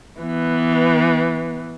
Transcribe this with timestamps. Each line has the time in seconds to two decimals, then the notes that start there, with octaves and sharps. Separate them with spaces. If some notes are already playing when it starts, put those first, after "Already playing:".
0.20 E3 B3